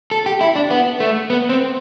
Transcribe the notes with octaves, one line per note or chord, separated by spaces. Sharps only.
A4
G4
E4
D4
B3
A3
B3
C4